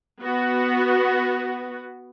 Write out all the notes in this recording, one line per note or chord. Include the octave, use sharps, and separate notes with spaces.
B3 F#4